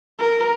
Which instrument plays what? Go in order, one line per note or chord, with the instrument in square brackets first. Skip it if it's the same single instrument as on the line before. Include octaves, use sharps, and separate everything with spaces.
[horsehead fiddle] A#4